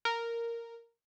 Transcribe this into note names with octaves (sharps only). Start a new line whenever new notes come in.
A#4